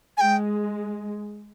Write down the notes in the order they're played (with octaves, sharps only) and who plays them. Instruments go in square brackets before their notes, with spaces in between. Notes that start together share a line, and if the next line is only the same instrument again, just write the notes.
[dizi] G#5
[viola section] G#3 [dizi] G5